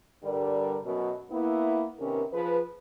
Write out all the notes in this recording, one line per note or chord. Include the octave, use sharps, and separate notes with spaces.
G2 D3 G3 A#4 D5
F#2 B2
A#3 B3 E4
C3 D#3 B3 C#4 A#4
F3 G#4 B4